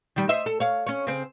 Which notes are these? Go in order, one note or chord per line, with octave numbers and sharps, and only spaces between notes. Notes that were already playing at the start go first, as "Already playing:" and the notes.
D#3 G3
C5 D#5 E5
A4
C#5 F5
C#4 C#5
C#3 C4